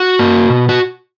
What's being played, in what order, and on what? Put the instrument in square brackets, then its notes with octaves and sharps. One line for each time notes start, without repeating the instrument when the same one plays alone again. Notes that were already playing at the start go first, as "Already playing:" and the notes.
Already playing: [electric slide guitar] F#4
A#3
B2
F#4